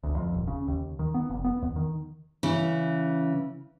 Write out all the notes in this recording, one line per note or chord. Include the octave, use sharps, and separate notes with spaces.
D2
F2
D#1
C#3
D#2
D#3
B3
F1
B3
E2
D#3
C#3 E3